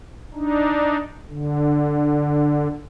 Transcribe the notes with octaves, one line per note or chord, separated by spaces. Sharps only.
D4 D#4
D3